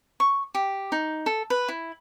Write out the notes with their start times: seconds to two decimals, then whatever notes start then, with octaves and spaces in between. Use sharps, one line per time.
0.20 C#6
0.55 G4
0.92 D#4
1.26 A4
1.50 B4
1.69 E4